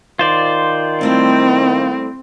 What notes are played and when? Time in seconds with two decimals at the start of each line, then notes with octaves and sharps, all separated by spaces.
0.19 D#3 F4 C5 D5
1.01 G3 A3 C4 E4